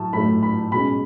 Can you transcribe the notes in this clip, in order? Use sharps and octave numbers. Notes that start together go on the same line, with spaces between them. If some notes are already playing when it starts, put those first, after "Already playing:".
Already playing: A2 F#3 A3 A5
A2 F#3 A3 B5
B5
B2 G#3 C#4 B5